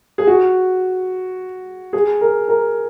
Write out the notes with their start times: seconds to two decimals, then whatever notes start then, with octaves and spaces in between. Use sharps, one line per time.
0.18 G#4
0.27 F#4
1.93 G#4
2.21 A#4
2.48 A#4